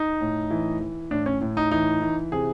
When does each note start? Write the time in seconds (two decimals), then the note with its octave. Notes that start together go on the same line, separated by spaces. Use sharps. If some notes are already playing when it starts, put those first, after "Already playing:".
Already playing: D#4
0.21 A2
0.51 E3
0.81 E3
1.11 A2 D4
1.26 C#4
1.41 A2
1.57 D#4
1.71 E3 D#4
2.02 E3
2.32 C3 G#4